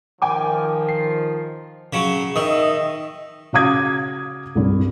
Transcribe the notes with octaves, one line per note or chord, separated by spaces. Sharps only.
D#3 F3 G5 G#5 D6
C7
C#3 F#3
D#3 D#4 D#5 E5 D#6
C#3 F#4 F5 D6 D#6 G#6
C2 G2